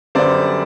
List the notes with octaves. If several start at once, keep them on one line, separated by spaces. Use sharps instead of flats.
F#2 D3 G3 B3 D4 C5 D5